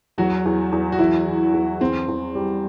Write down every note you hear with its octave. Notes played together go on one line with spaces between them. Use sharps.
E2 F#3 F#4
E2
E2
F#4
E2 E3 E4
E3
E2
E2 C4
E2
G3